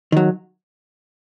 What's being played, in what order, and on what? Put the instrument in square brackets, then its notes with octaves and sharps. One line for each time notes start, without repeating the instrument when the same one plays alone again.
[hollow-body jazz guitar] D#3 F#3